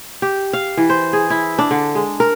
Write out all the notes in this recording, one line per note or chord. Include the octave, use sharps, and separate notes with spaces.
G4
F5
E3
C5
G#4
E4
D4
D3
G#3
A#4